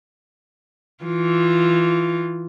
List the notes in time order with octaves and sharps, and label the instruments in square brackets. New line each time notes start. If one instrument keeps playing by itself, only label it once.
[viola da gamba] E3 F4